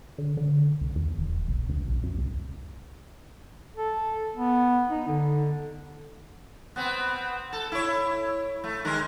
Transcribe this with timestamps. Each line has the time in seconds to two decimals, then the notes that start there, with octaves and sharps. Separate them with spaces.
0.18 D3
0.37 D3
0.81 C#2
0.96 E2
1.18 D#1
1.48 B1
1.69 D2
1.88 B1
2.03 F#2
2.18 C#2
3.77 A4
4.36 B3
4.90 D#4
5.08 D3
6.76 B3 C4
7.53 A4
7.72 E4 C#5
8.64 A3
8.85 D#3 G#3 A#4